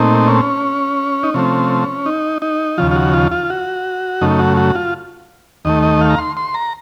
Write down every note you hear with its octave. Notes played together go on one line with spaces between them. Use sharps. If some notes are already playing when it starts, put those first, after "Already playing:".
Already playing: A#2 A3 C4 D#4
C#4
D#4
C3 F3 A3 C4 C#4
D#4
D#4
D#2 C#3 F3 F4
F4
F#4
F4
F4
F#4
F#2 C#3 A3 D#4
F#4
F#4
F4
D#2 D#3 A3 D#5
D#5
F5
A#5
C6
C6
A#5